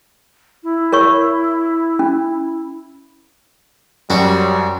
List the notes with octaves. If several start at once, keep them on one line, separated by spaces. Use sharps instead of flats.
E4
A#4 C#5 C#6
C#4
F#2 G3 F#4 C5 C#5